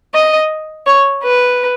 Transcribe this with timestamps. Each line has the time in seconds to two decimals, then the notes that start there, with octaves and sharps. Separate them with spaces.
0.14 D#5
0.86 C#5
1.23 B4